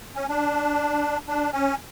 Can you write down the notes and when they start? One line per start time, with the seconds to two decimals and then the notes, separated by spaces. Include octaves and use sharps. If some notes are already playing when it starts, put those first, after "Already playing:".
0.15 C#4
0.29 D4
1.28 D4
1.53 C#4